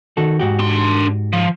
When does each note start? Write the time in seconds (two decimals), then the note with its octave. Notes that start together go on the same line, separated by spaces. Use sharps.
0.17 D#3 F#4 A4
0.39 G#2 F#4 G4
0.60 D4 C6
1.33 F3